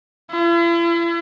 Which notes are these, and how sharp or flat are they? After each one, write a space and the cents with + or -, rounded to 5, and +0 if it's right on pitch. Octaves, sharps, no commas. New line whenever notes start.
E4 +45